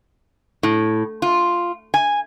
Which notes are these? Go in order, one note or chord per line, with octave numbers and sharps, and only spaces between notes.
A2
F4
G#5